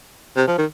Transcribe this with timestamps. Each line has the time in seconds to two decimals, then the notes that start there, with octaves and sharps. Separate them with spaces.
0.37 C3
0.48 F3
0.58 D#3